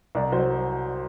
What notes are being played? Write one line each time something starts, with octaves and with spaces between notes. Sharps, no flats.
C2 D5
F#3 C5